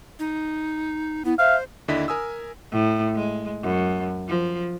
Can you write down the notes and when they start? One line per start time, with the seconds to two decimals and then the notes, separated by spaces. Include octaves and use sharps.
0.19 D#4
1.25 B3 E4
1.39 C5 E5 F5
1.88 D#2 D3 D4 E4 D#5 B6
2.08 A#4 G#5 D#6 E6
2.72 A2
3.15 G#3
3.62 F#2
4.28 F3